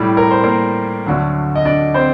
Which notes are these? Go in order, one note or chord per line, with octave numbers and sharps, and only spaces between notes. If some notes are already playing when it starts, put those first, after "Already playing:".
Already playing: A2 G3
A#4
C5
A#3 A#4
D2 D3 F#3
D#5
D4 D5
C4 C5